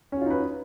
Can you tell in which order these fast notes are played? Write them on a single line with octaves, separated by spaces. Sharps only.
C#4 F#4 F4 D#4 B4